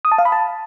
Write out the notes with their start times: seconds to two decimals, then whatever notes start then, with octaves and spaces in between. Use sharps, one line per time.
0.05 D#6
0.12 A5
0.18 F5
0.25 B5
0.32 A5